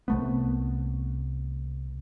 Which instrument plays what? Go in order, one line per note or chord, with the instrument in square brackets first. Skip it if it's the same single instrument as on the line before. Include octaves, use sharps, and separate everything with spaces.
[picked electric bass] C2 A3 B3